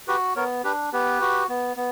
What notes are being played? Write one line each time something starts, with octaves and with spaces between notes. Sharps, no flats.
F#4 G4 B4
B3 A#4 C#5
D4 G4 B4
B3 G4 B4
F#4
B3
B3